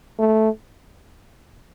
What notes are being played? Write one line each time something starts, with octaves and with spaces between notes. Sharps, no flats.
A3